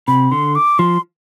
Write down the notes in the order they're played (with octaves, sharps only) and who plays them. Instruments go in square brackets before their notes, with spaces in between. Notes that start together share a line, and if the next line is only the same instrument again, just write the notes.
[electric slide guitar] C3 [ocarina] B5
[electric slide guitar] D3 [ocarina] C6
[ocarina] D6
[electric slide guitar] F3 [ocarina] C6